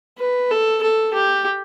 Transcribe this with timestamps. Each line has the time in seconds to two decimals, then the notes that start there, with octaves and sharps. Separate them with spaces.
0.18 B4
0.51 A4
0.83 A4
1.14 G4